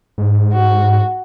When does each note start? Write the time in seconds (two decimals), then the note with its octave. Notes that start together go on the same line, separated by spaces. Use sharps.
0.18 G#2
0.54 F#4